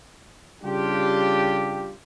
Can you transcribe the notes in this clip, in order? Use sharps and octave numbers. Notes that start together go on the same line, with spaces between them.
C#3 G3 D4 F4 G4